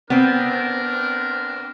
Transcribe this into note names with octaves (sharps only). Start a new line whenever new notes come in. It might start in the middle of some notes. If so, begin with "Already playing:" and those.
B3 C4 D4 A#4